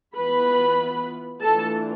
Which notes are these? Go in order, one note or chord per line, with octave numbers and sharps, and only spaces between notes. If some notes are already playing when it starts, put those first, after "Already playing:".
E3 B3 F4 B4 B5
E3 A3 D4 F4 A4 A5